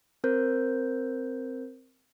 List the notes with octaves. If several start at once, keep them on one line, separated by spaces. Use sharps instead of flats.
C4 A#4 C5 G6